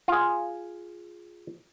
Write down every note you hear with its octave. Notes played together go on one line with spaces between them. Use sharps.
F4 G#4